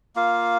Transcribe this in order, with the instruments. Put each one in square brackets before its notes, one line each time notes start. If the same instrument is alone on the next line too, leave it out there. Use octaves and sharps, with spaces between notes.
[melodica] A#3 F4 F5